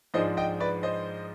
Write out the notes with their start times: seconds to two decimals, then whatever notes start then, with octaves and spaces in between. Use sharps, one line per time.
0.14 G#2 F3 G#3 D4 C5 D#5
0.37 D#5 G5
0.60 B4 D5
0.83 C5 D#5